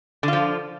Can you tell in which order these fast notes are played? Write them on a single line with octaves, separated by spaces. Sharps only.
D3 F4 F3